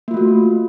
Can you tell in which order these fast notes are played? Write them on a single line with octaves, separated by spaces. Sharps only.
A#3 F4 A3 F#4